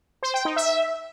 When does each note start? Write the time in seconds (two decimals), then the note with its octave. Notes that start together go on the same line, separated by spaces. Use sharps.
0.23 C5
0.34 G5
0.45 D#4
0.56 E5